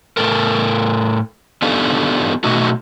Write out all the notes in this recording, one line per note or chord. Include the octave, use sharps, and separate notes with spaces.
A2 A4 A#4
B3 D4 D#4 F4 G4 A4
B2 A3 D#4 F#4